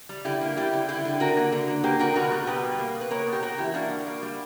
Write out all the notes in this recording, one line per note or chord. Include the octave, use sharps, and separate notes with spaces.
G3
D3 E4 G4
A#3
G3 E4 G4
D3
D3 E4 G4
D3
D3 F#4 A#4
A#3
D3
A#3
A#3 G4 B4
D3 F#4 A#4
B2 F#4 A#4
G3
B2 G4 B4
B2
A#3
B2
B4
A#3 A#4 C#5
B2
G4
A#3 F#4 A#4
E3 E4 G4
A#3 D4 F#4
G3
A#3
G3